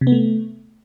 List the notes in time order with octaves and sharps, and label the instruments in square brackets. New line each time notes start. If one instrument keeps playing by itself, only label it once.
[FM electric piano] C3
B3
A3